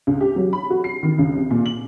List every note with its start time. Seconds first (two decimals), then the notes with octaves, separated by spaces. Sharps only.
0.07 C#2
0.21 G4
0.36 F#3
0.53 B5
0.70 F#4
0.84 C7
1.03 D#3
1.19 C#2
1.35 C3
1.50 A#2
1.66 F#7